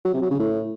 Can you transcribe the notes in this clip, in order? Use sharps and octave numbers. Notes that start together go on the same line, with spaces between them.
F#3
C3
F#3
C#3
A2